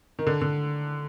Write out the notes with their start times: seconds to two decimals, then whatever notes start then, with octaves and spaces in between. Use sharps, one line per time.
0.19 D#3
0.27 D3
0.41 D3